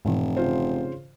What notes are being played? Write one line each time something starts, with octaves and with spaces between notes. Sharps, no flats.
F1 G#2 B2 E3
C#3 F4 C5